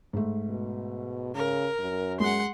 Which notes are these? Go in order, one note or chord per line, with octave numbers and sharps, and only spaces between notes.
G#2 A3
B2
C#3 A#4
F#2
G#3 F#5 C6